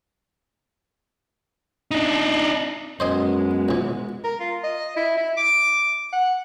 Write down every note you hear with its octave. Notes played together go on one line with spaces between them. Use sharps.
D4 D#4
F#2 G#3 B3 C5 D#5 G#5
A#1 E3
A#4
F4
D#5
E4
E4
D6
F#5